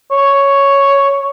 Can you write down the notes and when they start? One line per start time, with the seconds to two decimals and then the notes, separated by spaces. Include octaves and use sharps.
0.11 C#5